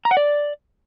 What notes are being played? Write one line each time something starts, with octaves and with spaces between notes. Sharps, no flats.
A#5
F#5
D5